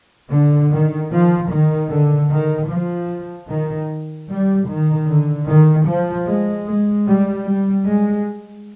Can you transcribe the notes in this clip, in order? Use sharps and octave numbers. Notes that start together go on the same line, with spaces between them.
D3
D#3
F3
D#3
D3
D#3
F3
D#3
G3
D#3
D3
D#3
F3
G#3
G#3
G3
G3
G#3